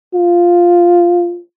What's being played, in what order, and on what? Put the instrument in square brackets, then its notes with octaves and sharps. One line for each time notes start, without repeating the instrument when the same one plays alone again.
[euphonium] F4